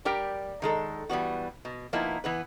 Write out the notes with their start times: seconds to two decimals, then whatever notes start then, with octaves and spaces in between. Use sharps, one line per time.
0.05 G3 G4 A#4 G5
0.62 D#3 G#3 A4
1.10 E3 G3 B3 F#4
1.65 B2
1.93 F3 A#3 B3 D#4 E4
2.24 E3 B3 B4